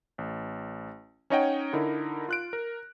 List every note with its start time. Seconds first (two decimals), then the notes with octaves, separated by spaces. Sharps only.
0.18 A1
1.30 C#4 D#4 C#5 D#5 F#5 G5
1.73 D3 D#4 E4 A#4
2.29 F4 F#6 D7
2.53 A#4